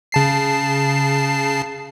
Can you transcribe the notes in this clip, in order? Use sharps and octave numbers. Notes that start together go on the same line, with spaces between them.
C#3 A5 C7